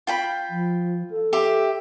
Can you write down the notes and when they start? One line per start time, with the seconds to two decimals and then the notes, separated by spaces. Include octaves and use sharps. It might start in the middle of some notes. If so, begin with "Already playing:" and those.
0.07 F4 G5 B5
0.50 F3
1.10 A4
1.33 G4 E5 C6